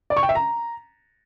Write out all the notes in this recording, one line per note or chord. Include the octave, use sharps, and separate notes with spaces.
D5
C#6
G5
E5
A#5